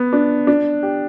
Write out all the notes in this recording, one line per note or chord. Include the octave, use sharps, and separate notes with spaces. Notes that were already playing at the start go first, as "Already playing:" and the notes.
Already playing: B3
D4
D4
G4